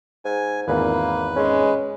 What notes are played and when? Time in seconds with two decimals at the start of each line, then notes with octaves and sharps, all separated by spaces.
0.25 G#2 G#5
0.68 G#1 E2 A#2 A#3 B4
1.36 G#3 C#4